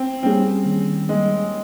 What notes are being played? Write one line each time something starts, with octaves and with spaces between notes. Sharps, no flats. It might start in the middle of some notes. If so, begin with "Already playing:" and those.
Already playing: C4
G3 A#3 C4 C#4 G#4
D#3
G3 G#3 A#3 C#4 G#4